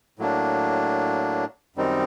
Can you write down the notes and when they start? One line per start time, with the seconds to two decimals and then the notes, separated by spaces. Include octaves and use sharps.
0.19 A2 F#3 A#3 D4
1.76 F#2 D#3 G3 C4 D#4